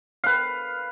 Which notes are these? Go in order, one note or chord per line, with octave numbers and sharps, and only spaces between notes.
B4 F5